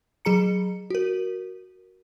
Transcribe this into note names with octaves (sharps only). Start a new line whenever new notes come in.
F#3 G#4 A#5 C#7
F#4 A#4